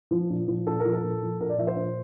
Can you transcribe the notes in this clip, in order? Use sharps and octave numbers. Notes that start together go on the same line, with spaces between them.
F3
A#2
F3
A#2 A4
F3 A#4
A4
A#2
F3
A#2 A#4
D5
F3 E5
C5
A#2